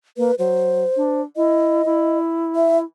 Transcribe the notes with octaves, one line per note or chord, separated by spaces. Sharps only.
A#3 B4
F#3 C5
D4
E4 D#5
E4
E5